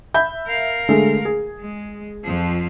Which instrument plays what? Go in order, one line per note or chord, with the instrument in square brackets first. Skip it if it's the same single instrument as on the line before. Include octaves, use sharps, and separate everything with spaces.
[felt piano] E5 B5 G6
[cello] A#4 F5
[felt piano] D3 G#3 A3
G#4
[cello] G#3
F2 F3